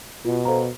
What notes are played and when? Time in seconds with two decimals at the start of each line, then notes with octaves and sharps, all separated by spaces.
0.25 B2 F4
0.45 A4 C5 F5 A#5